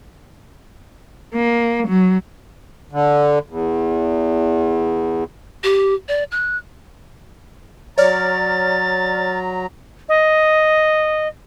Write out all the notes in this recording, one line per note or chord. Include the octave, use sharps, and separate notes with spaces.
A#3
F#3
D3
E2
G4
D5
F#6
F#3 C#5 D5 A#5 F6 A6
D#5